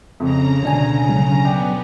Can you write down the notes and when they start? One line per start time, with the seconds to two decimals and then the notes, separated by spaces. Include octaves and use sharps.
0.20 F2 C#3 A#5
0.63 D2 B2 D4 G#5
1.09 F#3
1.45 B3 D5 G5